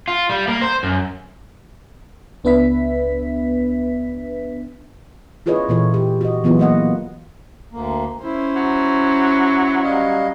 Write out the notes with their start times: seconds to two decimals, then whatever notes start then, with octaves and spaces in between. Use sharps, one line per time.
0.08 F4
0.30 G3
0.48 A#3
0.61 C5
0.83 F#2
2.44 C#2 B3 D4 B4 E5 B6
5.46 E4 F4 G#4 B4 C#5 D#5
5.69 A#2 E3 E4 F4 A4 C#5
5.94 G4
6.21 F#4 D#5
6.44 E3 F#3 B3 E4 F4 G#4
6.59 A#3 D#5 F#5
7.72 D2 A#3
8.24 C#4 E4 C5
8.56 F#3
9.83 G3 D#5 F5